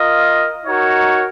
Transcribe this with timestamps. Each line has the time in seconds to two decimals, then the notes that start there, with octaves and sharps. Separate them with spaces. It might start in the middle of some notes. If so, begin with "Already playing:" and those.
Already playing: F4 A#4 D#5
0.65 D#4 F#4 A#4 C#5